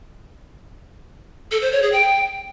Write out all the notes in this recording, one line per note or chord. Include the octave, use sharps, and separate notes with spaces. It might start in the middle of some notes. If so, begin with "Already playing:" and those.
A4
C5
C#5
G#4
G5